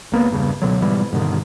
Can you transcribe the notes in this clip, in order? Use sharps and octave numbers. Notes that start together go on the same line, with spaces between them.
C#2 A#3 B3
E2 G2 C#3
C#2 B2 D3 F#3
G#2 B2 E3 G3
G2 B2 D3 D#3